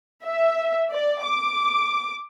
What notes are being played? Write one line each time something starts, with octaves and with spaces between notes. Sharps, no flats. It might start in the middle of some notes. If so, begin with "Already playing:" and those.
E5
D5
D6